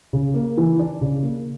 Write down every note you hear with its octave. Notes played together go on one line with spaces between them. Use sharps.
C#3
A#3
E3
D4
C#3
A#3